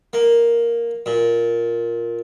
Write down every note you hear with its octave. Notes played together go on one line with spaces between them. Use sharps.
A#3
A#2